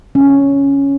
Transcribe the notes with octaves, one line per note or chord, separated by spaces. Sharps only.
C#4